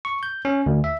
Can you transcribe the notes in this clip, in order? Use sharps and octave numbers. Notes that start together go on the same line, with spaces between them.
C#6
G6
C#4
D2
E5